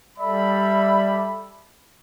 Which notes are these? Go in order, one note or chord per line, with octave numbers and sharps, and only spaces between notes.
G3 A4 D5 E5 B5